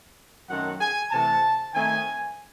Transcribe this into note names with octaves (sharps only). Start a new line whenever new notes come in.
F#2 D#3 F#3 A3 C4 F#5
G#5
C3 E3 A3 A5
D#3 A3 C4 D#4 G#5